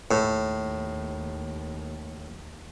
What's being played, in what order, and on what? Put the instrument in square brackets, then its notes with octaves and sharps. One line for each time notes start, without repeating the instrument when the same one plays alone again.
[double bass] D#2 [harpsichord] A2